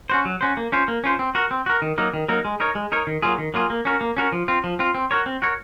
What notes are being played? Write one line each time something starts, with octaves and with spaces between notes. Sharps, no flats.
C#4 F#4 C5
F#3
C#4 F#4 C5
A#3
C#4 F4 C5
A#3
C#4 F4 C5
C4
F#4 A#4
C4
F#4 A#4
D#3
F#3 A#3 D#4 A#4
D#3
F#3 A#3 D#4 A#4
G#3
D#4 A#4 C#5
G#3
D#4 A#4 C#5
D#3
F#3 A#3 F4 G#4
D#3
F#3 A#3 F4 G#4
A#3
C#4 F#4 A#4
A#3
C#4 F#4 A#4
F3
C4 F4
F3
C4 F4
C4
F#4 A#4 C#5
C4
F#4 A#4 C#5